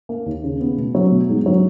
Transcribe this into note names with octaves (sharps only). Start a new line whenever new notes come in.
A#3
D#2
C#3
B3
B2
F#3
B2
G#2
F#3